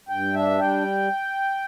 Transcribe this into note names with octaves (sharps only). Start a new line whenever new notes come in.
G2 G5
D4 E5
G3 G5